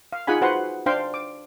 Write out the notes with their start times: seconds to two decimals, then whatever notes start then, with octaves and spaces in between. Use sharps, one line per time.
0.12 F5
0.27 D#4 F4 G#4 F#5 G#5 B5
0.41 F#4 B4 C5 F#5 C6
0.86 D4 C5 F5 G5 C6
1.14 D6